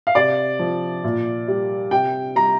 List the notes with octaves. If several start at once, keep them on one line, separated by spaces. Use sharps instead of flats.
F5
C3 D5
F3
A#2
G3
C3 G5
G3 A#5